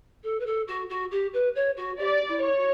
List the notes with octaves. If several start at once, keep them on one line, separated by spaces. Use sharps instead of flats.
A4
B4
A4
F#4
F#4
G4
B4
C#5
F#4
G4 D5
E4
C#5
F#4